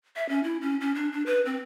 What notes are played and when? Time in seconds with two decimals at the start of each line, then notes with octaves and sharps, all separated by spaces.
0.16 E5
0.29 C#4
0.44 E4
0.61 C#4
0.81 C#4
0.95 D4
1.12 D4
1.26 B4
1.46 C4